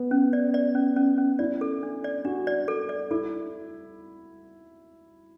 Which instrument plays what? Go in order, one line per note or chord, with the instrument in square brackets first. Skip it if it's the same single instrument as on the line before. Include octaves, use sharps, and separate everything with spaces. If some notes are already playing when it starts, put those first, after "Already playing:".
Already playing: [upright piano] B3
[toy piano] C#4
D5
D5
C#4
C#4
C#4
[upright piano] E4 [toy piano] D5
[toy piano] A4
D4
D5
[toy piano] D4 [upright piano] F#4
[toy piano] D5
A4
D5
[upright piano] E4 [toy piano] A4